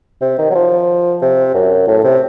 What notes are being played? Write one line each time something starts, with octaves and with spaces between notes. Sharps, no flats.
C3
D#3
F#3
F3
C3
F#2
A2
C3